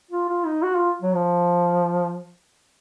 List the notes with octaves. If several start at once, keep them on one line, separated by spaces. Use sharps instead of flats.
F4
F4
D#4
F#4
F4
F#3
F3